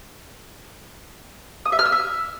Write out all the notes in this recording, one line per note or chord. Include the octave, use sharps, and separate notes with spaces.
D#6
E5
F6
E6
E5